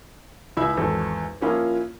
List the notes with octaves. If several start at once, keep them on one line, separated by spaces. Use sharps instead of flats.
C#2 E4 E5
G#1 E2 A4
F3 A#3 C#4 E4 F4